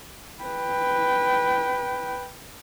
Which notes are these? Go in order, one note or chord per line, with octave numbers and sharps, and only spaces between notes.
B4 G5